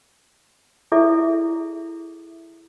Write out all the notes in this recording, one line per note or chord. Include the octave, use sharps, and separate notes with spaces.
E4 G#4 A4 D5 E5